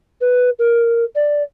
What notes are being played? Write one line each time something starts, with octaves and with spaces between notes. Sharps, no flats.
B4
A#4
D5